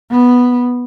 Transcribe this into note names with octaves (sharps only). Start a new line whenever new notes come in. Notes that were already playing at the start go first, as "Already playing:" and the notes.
B3